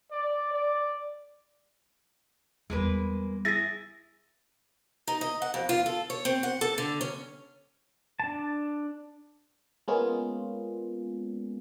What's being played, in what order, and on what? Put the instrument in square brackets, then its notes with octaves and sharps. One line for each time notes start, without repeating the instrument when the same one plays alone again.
[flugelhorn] D5
D5
[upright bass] E2 G3 [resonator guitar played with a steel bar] G#3 A#3 B4
[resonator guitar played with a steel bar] E4 G#4 [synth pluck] A6 A#6
[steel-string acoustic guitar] D#4
D#5
F#5
F2
F4
A4
C#5
C4
F#5
A4
D3
C#4
[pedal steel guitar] D4 A5
[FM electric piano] G#3 A#3 B3 C#4 F4 G#4